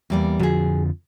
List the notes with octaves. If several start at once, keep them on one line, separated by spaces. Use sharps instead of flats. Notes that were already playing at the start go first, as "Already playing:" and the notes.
E2 G3 A#3
F2 D3 F3 F#4 G#4